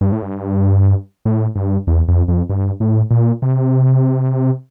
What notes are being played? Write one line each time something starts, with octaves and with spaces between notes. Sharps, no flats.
G2
A2
G2
A2
G2
E2
F2
F2
G2
A2
A#2
C3